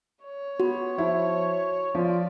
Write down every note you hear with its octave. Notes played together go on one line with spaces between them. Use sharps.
C#5
B3 F#4
F3 E4
F3 F4 D5